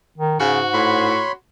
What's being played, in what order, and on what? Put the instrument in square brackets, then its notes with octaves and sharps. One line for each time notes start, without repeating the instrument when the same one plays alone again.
[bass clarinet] D#3
[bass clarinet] G#2 [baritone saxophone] C#3 [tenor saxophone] F#4
[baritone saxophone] A2 [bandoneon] C#5 B5 C6